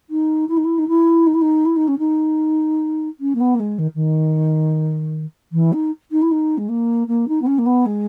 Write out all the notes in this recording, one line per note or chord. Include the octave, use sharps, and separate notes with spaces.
D#4
E4
D#4
E4
D#4
E4
D#4
E4
D#4
E4
D#4
C#4
D#4
C#4
A#3
B3
A#3
G#3
D#3
D#3
E3
D#4
D#4
E4
D#4
G#3
A#3
A#3
D#4
B3
C#4
A#3
B3
G#3